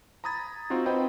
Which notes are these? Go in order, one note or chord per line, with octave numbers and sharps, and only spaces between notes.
A#5 B5 D#6 G#6 A6
C4 D#4 F4 F#4
C4 B4 C5 D#5 G5 B5